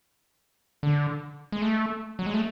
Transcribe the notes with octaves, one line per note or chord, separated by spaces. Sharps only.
D3
G#3
A3
F#3
G#3
A3